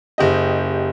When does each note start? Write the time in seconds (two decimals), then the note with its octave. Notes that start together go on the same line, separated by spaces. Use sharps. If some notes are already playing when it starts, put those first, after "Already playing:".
0.18 F#1 G4 D#5